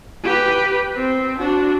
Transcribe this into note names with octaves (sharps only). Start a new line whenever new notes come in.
G4 B4
C4
D4 F#4